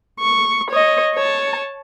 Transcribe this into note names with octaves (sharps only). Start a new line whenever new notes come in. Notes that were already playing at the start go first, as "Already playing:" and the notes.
C#6
C#5 D#5
C#5 A5